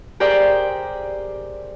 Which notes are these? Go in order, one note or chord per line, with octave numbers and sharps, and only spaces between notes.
G4 G#4 A#4 C5 D5 G5